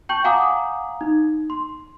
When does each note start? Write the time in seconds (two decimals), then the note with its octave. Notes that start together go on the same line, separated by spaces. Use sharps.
0.09 G5 A5 C#6 G6 F#7
0.24 F5 F#5 G#5 A#5 D6 D#6
1.01 D#4
1.50 C6